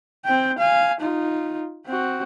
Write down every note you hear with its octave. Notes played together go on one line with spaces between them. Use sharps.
C4 G5
F5 G#5
D#4 F4
C4 F#4